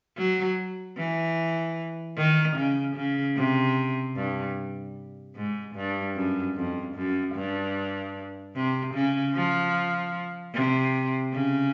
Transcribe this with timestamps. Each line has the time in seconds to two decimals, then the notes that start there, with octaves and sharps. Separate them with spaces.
0.17 F#3
0.97 E3
2.17 D#3
2.57 C#3
2.96 C#3
3.36 C3
4.16 G2
5.36 G#2
5.75 G2
6.16 F#2
6.56 F2
6.95 F#2
7.35 G2
8.55 C3
8.94 C#3
9.34 F3
10.54 C3
11.33 C#3